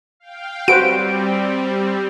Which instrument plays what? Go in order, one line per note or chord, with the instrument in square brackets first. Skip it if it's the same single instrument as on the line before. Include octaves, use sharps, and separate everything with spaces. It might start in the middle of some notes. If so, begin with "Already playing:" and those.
[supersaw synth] F5 G5
[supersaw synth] G3 C4 [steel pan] F#4 B4 C5 [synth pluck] D7